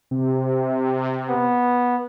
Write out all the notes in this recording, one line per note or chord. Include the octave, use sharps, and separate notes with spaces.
C3
B3